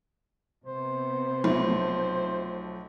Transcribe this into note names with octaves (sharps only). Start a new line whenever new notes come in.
C3 B3 C5
B1 F3 A3